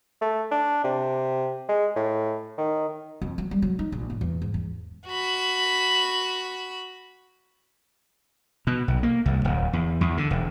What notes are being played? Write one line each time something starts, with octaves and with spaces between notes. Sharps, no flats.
A3
D4
C3
G#3
A2
D#3
F2
F#3
G3
F#3
D#4
A#1
A2
E2
G#2
E2
F#4 B5
B2
B1
A#3
C2
D1
E2
E2
D3
E1